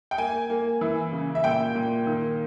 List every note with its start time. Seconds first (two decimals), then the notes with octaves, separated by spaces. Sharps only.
0.11 G5
0.18 A#3 G#5
0.50 A#3
0.81 E3
1.12 C#3
1.35 E5
1.44 A#2 G5
1.75 A#2
2.07 D#3